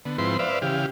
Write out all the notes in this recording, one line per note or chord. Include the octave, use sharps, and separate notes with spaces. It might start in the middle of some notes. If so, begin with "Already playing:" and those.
D3 B3
G#2 F3 C4 E4 B4 C6
B4 C5 D5 E5 F5
C#3 E3 G4 F5